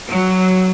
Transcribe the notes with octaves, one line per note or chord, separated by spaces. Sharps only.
F#3